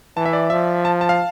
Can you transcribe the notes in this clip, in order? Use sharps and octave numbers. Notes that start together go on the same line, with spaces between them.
E3 A5
E5
D5
F3 E5
A5
A5
F5